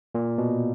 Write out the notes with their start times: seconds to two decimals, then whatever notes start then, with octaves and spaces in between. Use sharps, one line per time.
0.15 A#2
0.38 B2